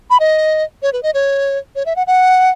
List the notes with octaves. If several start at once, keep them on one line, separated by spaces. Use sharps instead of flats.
B5
D#5
C#5
B4
D#5
C#5
C#5
E5
F#5
F#5